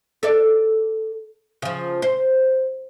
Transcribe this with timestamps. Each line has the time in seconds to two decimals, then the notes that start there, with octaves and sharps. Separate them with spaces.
0.23 A4 D5
1.62 C#3 F3
2.02 C5